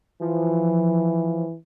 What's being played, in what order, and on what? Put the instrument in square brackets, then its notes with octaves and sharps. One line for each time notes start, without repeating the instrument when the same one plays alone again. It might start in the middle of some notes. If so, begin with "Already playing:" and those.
[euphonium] E3 [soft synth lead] F3